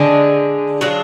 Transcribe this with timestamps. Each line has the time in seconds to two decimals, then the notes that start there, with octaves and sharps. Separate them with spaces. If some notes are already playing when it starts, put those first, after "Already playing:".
Already playing: D3 G#3 D4 G#4
0.81 F#3 D4 F4 G#4